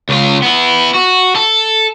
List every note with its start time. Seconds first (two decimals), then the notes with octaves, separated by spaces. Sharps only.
0.09 C#2 F4
0.42 B3 E4
0.94 F#4
1.35 A4